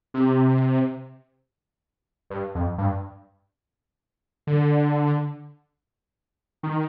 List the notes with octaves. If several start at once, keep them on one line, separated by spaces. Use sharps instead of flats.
C3
G2
F2
G2
D3
D#3